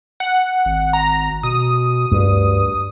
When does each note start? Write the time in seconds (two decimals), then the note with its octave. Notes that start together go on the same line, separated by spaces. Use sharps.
0.20 F#5
0.65 G#1
0.93 A#5
1.43 B2 D#6
2.12 D2 G2